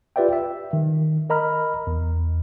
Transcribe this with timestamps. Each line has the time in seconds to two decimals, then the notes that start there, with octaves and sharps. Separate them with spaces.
0.16 F4 G4 B4 D5 E5 G5
0.33 E5
0.73 D#3
1.30 A#4 D#5 A#5 B5 F6
1.87 E2